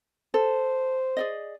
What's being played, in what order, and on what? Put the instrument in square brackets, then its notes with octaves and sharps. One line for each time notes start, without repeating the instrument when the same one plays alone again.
[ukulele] A4 [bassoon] C5
[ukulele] G#4 D5 D#5